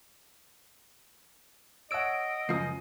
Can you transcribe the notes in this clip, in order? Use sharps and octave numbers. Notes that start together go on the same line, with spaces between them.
C#5 D#5 F#5 E6 D7
C#2 F#2 F3 D#6 C7